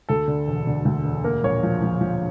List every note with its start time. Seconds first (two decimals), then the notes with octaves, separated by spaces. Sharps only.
0.09 D2 A4
0.28 D3
0.47 E1
0.67 D3
0.85 D2
1.05 E1
1.24 A#3 A#4
1.43 A#1 C#5
1.63 F3
1.82 F3
2.01 F3